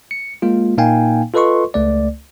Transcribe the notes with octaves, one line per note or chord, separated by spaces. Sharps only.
C#7
G#3 A#3 F4
A#2 A#3 D#4 F5 G5 G#5
F4 A4 B4 D#5 C6 C#6
C#2 A3 D5